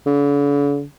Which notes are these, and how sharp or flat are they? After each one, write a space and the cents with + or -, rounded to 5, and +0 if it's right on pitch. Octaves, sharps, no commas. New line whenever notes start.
D3 -45